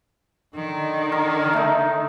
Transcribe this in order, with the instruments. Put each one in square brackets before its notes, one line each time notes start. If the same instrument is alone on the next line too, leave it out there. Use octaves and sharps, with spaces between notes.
[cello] D3 D#3
[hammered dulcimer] A#4
A3 D#4